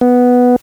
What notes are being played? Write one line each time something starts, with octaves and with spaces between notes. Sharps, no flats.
B3